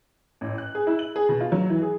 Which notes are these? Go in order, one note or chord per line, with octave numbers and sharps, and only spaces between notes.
A1
F#6
G#4
E4
F#7
G#4
B2
F4
F#3
E3
G#4